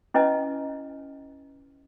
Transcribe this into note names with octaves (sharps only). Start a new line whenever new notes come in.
C#4 E4 B4 D#5 G#5